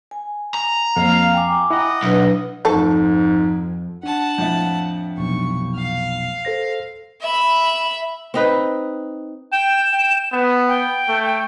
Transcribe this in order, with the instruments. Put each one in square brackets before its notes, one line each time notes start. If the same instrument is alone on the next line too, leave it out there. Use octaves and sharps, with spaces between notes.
[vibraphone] G#5
[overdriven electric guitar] A#5
[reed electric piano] F2 [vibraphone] A#3 [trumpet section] F5
[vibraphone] G5 G#5 D6
[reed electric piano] E4 [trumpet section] D#5 F#5
[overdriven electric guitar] B1 [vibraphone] F#3 D4 B4
[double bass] F2 [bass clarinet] G#2 [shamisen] A3 A4
[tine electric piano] D4 [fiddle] F#5 A5
[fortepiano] F2 A2 E5
[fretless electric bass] F1 B1 [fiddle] C#6
[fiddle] F5
[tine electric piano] A4 C5 A#6
[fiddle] E5 B5
[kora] C4 D#4 B4
[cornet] G5 [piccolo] E7
[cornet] G5
B3
[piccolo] G5
[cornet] A3